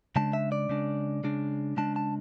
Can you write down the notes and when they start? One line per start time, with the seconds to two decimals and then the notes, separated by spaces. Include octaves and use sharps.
0.16 C#3 G#3 D4 A5
0.33 E5
0.52 D5
0.69 C#3 G#3 D4
1.24 C#3 G#3 D4
1.77 C#3 G#3 D4 A5
1.96 A5